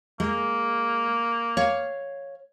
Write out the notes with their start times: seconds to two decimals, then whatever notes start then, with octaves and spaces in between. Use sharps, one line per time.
0.20 G#3 A#3
1.57 C#5 F5